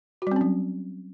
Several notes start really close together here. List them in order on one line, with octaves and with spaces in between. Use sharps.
F#4 G3 C4 C#4 F#3